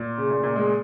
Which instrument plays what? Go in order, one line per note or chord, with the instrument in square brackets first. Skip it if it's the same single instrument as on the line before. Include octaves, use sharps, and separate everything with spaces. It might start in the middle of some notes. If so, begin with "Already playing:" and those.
Already playing: [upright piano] A#2
C#3
A#2
A#2
G#3